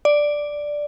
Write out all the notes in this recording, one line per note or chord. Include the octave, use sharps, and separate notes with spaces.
D5